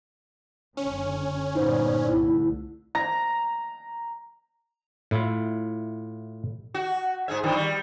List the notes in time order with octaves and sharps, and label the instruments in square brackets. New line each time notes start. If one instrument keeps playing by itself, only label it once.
[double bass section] F#1 D3 [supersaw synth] C#4
[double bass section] G1 A#2 B3 [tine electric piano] D#4 C5 [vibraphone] D5
[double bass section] C2 D3 A3 [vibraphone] E4
[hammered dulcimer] A#5
[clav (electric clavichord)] A2 E4 F4 E5
[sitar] F#4
G#2 G#4 E5
G2 D#3 F3
G3